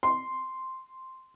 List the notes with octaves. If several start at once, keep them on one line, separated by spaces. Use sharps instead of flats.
C6